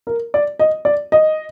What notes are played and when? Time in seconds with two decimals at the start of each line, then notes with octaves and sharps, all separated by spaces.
0.07 A#4
0.34 D5
0.59 D#5
0.85 D5
1.12 D#5